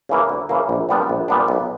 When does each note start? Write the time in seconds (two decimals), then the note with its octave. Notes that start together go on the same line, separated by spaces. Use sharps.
0.09 C#3 E3 A#3
0.29 D2
0.49 C#3 E3 A#3
0.69 A#1
0.89 A#2 G3 B3 D4
1.09 A#1
1.28 A#2 G3 B3 D4
1.48 B1